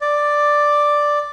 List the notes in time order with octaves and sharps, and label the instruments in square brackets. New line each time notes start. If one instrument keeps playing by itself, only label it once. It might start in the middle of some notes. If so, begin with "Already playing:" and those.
[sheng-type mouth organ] D5